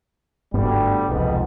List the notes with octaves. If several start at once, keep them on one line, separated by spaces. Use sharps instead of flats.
G1 D2 G#2 G3 B3
E1 C2 F2 G#2 B3